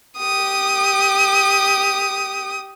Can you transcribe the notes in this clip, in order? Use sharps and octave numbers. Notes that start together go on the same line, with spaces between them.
G4 D#6